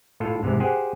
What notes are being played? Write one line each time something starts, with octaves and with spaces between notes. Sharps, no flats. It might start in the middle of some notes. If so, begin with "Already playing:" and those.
A2 F4 A4
G#2 C3 E3
G4 G#4 C5 F#5 G#5